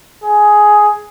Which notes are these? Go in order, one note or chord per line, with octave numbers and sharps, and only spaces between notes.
G#4